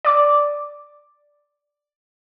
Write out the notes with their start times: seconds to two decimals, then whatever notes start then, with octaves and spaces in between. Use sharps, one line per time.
0.05 D5 D6